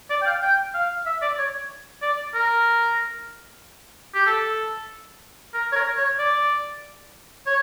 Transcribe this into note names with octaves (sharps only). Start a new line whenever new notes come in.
D5
G5
F5
G5
F5
E5
D5
C#5
D5
A#4
G4
A4
A#4
C#5
A#4
C#5
D5
C#5